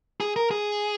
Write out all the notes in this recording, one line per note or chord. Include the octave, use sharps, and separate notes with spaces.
G#4
A#4
G#4